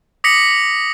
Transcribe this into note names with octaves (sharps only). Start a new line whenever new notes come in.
D6 D#6 A#6 B6 C#7 F#7